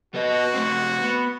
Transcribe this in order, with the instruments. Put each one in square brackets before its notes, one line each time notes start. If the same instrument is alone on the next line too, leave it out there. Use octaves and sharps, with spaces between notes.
[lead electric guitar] B3 D#5 [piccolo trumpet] F#4
[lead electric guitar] A3 C4
B3